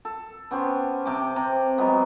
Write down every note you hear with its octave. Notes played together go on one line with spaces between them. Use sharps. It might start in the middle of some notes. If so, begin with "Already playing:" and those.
A4
B3 C#4 G4 C5
C3 G4 G5 D6
C3
F#3 G#3 B3